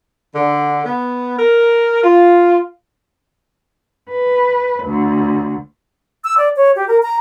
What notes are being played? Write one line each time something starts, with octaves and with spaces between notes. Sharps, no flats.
D3
B3
A#4
F4
B4
D2
E6
D5
C#5
G4
A#4
A#5